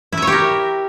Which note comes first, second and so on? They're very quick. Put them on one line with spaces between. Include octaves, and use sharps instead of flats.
E4 E5 C#5 G4 A#4